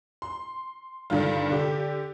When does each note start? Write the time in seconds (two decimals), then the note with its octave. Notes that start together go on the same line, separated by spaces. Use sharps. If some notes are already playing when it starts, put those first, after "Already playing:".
0.22 C6
1.10 G2 D3 D#3 F4
1.50 D3 G4